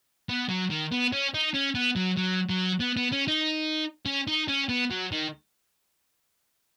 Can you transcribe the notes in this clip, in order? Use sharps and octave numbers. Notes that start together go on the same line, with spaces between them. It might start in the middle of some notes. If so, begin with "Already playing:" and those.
B3
F#3
D#3
B3
C#4
D#4
C#4
B3
F#3
F#3
F#3
B3
B3
C#4
D#4
C#4
D#4
C#4
B3
F#3
D#3